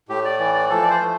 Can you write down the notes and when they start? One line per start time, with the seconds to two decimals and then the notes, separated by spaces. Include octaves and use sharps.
0.09 A2 G4
0.25 D5
0.39 E3 D5
0.54 D5
0.69 F3 A4
0.83 D5
0.90 C5
1.00 A3